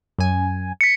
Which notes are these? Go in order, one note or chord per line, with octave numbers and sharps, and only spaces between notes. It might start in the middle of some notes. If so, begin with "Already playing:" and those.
F#2 G#5
B6 C#7